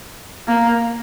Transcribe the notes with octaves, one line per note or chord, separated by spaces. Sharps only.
A#3